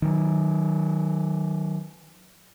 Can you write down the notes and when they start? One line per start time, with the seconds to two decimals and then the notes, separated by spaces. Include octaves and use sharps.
0.02 D#3 F#3